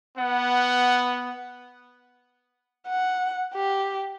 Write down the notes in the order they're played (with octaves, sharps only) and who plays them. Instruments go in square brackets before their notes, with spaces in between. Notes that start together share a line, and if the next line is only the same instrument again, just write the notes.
[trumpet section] B3 F#5
[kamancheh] F#5
G4